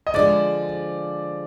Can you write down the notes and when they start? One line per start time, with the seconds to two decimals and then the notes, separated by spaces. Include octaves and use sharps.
0.07 D#5
0.14 D3 F3 G#3 D5